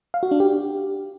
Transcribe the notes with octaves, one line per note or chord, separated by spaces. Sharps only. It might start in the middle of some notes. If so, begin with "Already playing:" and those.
F5
F#4
D4
G4